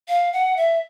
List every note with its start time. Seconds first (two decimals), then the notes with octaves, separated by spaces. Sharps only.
0.08 F5
0.33 F#5
0.57 E5